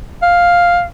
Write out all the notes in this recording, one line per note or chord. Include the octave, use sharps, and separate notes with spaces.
F5